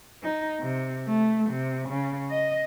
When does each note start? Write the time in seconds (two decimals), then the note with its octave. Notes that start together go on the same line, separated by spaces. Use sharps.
0.23 D#4
0.60 C3
1.07 A3
1.50 C3
1.89 C#3
2.30 D#5